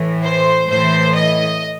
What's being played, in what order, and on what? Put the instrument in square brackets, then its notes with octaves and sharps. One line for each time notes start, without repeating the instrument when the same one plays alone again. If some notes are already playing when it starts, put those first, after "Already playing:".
Already playing: [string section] A2 E3
C5
A2 E3 C5
D#5